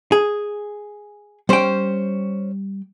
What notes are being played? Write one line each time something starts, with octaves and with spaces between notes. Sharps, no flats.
G#4
G3 C#4 C5 G5